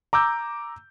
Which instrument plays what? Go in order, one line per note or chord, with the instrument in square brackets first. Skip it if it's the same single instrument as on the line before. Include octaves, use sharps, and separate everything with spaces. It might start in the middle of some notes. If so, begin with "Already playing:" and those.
[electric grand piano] A#5 D6 E6 G6